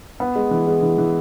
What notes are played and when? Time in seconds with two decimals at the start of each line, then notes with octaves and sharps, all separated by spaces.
0.20 B3
0.36 G#3
0.51 E3
0.67 G#3
0.83 E3
0.98 E3